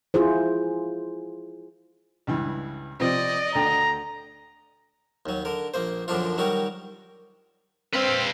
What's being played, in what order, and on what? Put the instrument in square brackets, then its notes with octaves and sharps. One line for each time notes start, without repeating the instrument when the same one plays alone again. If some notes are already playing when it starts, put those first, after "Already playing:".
[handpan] E4 F4 G#4 C5
[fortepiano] C#2 G2 E3
[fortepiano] C3 F3 C4 [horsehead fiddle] D5 D#5
[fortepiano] D2 D3 G5 [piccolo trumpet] A#5
[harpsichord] D#2 F#3
D3 A#4
A#1 A#3 C5
F#2 A#2 D3 F3 D4 F4
D#3 F#3 G3 F#4 A#4
[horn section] C4 [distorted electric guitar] B4 F5